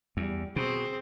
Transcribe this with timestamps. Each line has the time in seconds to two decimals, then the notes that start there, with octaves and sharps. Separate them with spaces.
0.17 E2 G3
0.56 B2 C4 G#4